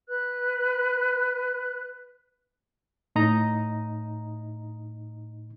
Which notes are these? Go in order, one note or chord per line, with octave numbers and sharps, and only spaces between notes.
B4 F#6
A2 D#4 D#5 A#5